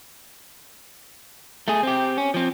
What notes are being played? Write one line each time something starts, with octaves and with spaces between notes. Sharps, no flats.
A3 G#4
C4 G4
C#4
F3 C4